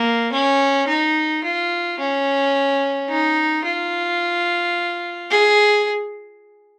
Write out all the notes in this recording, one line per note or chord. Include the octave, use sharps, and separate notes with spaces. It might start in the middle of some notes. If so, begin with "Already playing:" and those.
Already playing: A#3
C#4
D#4
F4
C#4
D#4
F4
G#4